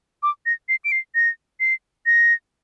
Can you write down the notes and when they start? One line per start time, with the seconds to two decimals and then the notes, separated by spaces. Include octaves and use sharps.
0.23 D6
0.46 A#6
0.69 C7
0.85 D7
0.92 C7
1.15 A#6
1.60 C7
2.06 A#6